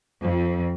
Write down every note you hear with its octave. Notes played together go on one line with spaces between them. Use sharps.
F2